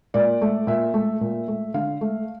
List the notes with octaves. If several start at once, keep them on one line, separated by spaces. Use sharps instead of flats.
A#2 D5
A3
A#2 E5
A3
A#2
A3
D3 F5
A3